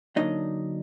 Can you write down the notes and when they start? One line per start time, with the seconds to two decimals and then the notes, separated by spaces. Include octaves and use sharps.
0.16 D3 F#3 A#3 D4 D#4 D#5